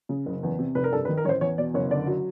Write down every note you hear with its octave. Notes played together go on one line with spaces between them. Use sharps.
C#3
F#1
E2
C3
F1 B4
A#4
G2 A4
B4
D#3
A#4
A1 C5 C#5
E2 C#5
B2 D5
F#1 C#5
D3 D5
F#3